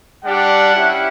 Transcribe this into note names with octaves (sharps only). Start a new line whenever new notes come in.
G3 D4 G4 F#5
C#4 E4 G4